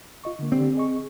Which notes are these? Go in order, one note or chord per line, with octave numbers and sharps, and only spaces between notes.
F4 D#5 C#6
D3 A#3
D3 C4 G4 D5
G#4 D#5 C#6